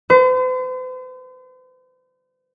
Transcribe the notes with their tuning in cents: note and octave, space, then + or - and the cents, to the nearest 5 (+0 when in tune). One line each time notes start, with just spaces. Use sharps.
C5 -45